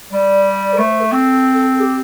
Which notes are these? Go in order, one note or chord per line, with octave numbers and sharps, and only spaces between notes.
G3 D5
D5
A4
A3 C5
C5
A4
C4
G4